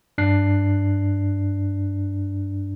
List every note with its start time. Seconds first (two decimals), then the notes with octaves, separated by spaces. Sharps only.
0.18 G2 D4 F#6 C7